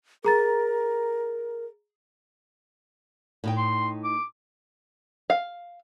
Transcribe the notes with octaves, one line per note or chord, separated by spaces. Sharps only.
G#4 A#4 A#5 A6
A2 D#4 G5
C6
D6
F5